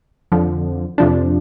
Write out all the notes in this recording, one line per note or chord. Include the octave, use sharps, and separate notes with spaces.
F2 D3 F3
F2 C3 F3 D4